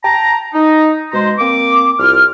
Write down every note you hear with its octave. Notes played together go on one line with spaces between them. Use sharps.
G5 A5 A#5
D#4
B2 G#3 C5 A#5 C6
A#3 C4 D6
C2 F4 F6